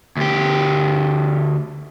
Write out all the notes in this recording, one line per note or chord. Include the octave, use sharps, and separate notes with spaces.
D2 G4